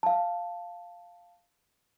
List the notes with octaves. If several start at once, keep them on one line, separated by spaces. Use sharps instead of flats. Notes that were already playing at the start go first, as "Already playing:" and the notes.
F5 A5